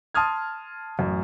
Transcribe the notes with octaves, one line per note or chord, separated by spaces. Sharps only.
A5 C6 D#6 F6 G#6
A1 F#2